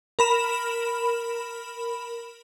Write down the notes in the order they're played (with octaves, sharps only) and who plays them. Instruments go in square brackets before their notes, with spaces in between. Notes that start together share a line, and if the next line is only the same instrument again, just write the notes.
[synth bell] A#4 B5 E7